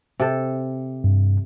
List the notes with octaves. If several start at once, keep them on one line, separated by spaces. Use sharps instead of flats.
C3 A4
G2